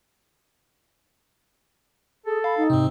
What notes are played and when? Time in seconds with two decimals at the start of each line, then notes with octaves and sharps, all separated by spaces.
2.26 G#4 A4
2.44 F5 B5
2.57 D#4
2.70 G#2 C3 C4